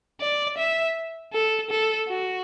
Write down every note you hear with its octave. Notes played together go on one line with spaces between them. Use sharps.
D5
E5
A4
A4
F#4